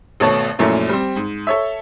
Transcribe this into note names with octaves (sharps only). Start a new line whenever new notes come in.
G#1 B2 A3 C#5 A5
F#2 A#2 F3 A3 C#4 E4
G3 C4
G#2
A4 C#5 E5